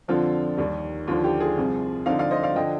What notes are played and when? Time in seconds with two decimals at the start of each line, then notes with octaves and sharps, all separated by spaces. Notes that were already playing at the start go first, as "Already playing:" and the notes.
0.08 F2 D3 F3 C4 F4
0.57 D#2 D#3 G3
1.08 D#2 D3 F3 F4
1.24 G4
1.40 F4 G#4
1.57 C2 C3 F3
2.06 D3 F3 C4 D#4 D5 F5
2.19 D5 F5
2.31 C5 D#5
2.43 D5 F5
2.55 D3 F3 D#5 G5